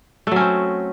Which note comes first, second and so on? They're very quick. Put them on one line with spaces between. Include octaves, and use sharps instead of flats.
A3 F#3 C#4 C4